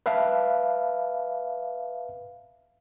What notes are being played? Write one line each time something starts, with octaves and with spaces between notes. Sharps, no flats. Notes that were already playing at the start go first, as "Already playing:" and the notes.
B4 E5 F5 A5